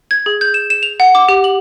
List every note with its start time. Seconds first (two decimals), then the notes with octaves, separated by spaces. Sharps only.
0.11 G#6
0.26 G#4
0.41 G6
0.54 E7
0.70 E7
0.83 F7
1.00 F#5
1.15 D6
1.29 G4
1.44 F#7